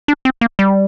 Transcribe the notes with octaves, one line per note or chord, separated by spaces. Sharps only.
D4
C4
A#3
G3